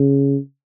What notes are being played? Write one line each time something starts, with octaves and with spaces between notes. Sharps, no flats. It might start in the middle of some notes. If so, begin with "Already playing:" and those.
Already playing: C#3